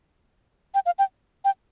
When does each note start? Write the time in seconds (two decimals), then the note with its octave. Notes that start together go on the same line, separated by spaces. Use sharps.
0.74 G5
0.86 F5
0.99 G5
1.45 G5